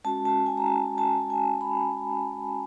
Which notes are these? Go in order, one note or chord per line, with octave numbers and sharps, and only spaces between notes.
G#3 C#4 F#4 A5
A5
G#5
A#5
A5
A5
G#5
B5